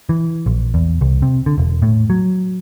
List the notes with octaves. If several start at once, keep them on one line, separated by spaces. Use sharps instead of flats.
E3
A#1
E2
C2
C3
D3
E1
A2
F#3